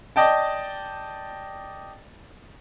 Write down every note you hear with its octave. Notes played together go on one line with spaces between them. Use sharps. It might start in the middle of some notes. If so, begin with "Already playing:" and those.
D5 D#5 G5 A5